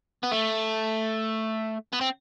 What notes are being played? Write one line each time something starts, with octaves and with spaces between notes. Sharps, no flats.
B3
A3
B3
C4